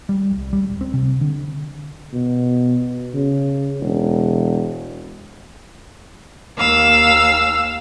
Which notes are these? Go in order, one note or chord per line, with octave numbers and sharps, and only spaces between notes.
G3
C2
G3
D1
C4
C3
D3
B2
C#3
E1
D#2 F5 E6